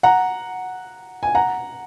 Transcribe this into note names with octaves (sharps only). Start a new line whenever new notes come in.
F#5 A#5
G#5
F#5 A#5